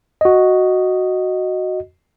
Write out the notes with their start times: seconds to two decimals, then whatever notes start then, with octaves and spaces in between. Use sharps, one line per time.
0.21 F#4 D#5